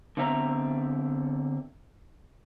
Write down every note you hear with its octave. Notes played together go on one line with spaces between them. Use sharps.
D3 B3 C4 E5 A#5